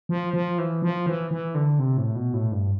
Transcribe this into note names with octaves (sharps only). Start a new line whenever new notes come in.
F3
F3
E3
F3
E3
E3
D3
C3
A2
B2
A2
G2